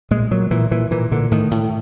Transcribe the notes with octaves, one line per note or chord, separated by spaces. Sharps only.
A#2 G#3
A#2 F#3
A#2 E3
A#2 E3
A#2 E3
A#2 D3
A2 D#3
A2